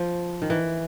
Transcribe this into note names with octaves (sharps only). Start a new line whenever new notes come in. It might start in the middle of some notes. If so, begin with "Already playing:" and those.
Already playing: F3
D#3
E3